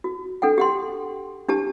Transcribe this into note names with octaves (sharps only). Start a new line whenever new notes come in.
F#4
D4 A4 F#5 G5
G4 F#5 C6
D4 G4 A5